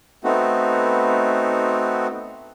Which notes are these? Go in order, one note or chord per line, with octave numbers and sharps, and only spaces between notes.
A3 B3 C4 D#4 F#4